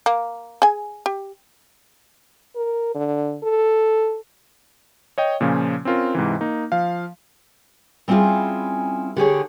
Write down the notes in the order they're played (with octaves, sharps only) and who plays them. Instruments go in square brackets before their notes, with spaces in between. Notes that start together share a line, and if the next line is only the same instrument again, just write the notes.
[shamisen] A#3
G#4 G#5
G4
[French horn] A#4
D3
A4
[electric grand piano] C#5 D#5 G5
A#2 C#3 F3 C#4
C4 C#4 F4 A#4
G#2 C3 E3
A#3 D#4
F3 F5
[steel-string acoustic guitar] G3 C4 C#4 E4 F4 G#4
D3 G4 G#4 C#5